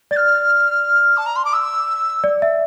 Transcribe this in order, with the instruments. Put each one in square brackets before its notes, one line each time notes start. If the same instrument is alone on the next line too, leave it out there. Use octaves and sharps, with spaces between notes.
[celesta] D5 [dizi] A6
[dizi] F6
A5
A#5
C6
D6
E6
[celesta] D5
E5